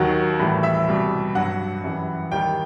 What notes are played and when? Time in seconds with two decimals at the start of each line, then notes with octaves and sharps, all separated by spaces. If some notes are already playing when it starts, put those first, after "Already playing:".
Already playing: D#2 D#3 F#3 F#4
0.39 A2 E3 G3
0.63 E5
0.87 C2 B2 G3
1.35 G2 F#3 F#5
1.83 F#2 E3 G3
2.32 D#2 D#3 G3 G5